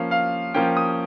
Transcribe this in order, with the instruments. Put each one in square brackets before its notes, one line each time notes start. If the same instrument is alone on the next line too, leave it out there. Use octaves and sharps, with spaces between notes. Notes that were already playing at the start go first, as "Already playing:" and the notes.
Already playing: [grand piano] F3 A#3 C#4 F5
F5
F3 A#3 C#4 G5
D#6